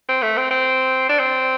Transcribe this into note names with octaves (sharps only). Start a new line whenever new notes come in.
C4
A3
C4
C4
D4
C4